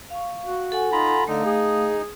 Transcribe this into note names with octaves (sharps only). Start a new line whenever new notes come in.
F5 C#6
F#4
A4 F#5 G#5
D#4 F4 A#5 B5
D3 A3 D#4 F5
G#4